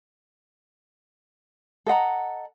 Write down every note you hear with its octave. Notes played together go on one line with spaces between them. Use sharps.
A4 D#5 F#5 A#5